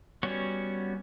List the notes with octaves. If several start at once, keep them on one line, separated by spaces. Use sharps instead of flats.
G3 B3 C#4 F#4 C#5